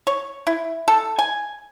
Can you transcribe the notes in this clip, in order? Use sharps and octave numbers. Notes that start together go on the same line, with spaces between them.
C#5
E4
A4
G#5